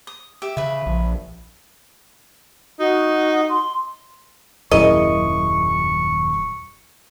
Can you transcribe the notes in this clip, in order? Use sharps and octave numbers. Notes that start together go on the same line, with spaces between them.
D#6
G4 E5
C#3 B4 E5
A#1
D#4 F#4
C6
D#1 F#2 E4 G#4 A#4 D#5 C#6